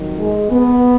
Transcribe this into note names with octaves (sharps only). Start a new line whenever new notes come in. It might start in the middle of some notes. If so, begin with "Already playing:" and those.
Already playing: F2 D#3 F#3
G#3
B3